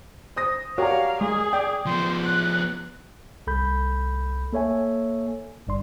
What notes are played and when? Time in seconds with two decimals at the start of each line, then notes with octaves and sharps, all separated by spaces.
0.36 C5 D#6 A#6
0.78 F#4 G4 A#4 C#5 D5 F5 A#5
1.21 G#3 G#4
1.53 D5 G5
1.86 F3 B3 C5
2.23 F#6
3.47 C2 A4 B5 G6
4.53 A#3 A4 C#5 E5 G#5
5.67 G1 G2 D5 C6